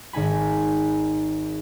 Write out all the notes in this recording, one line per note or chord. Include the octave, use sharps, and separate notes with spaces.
G#1 D#4 G#5 B5